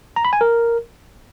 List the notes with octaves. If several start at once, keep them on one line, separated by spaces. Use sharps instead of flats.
A#5
B5
G#5
A#4